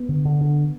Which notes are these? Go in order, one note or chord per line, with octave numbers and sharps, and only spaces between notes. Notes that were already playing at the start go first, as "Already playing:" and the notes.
Already playing: B3
D3
D3
D3